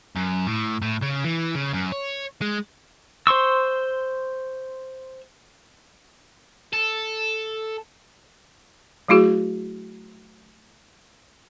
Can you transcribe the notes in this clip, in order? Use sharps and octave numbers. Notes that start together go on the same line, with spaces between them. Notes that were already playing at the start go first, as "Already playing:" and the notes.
F#2
A2
A2
C#3
E3
C#3
F#2
C#5
G#3
C5 C6 C#6 E6
A4
F#3 A3 E4 F#4 G#4